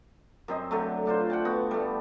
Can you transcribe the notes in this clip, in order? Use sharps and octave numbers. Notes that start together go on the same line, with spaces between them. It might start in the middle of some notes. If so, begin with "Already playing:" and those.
F#2 C4 D#5
D3 F#3 A3
A3 D4 F4 C5
F#5 G5 A5
B3 F#4
G3 A3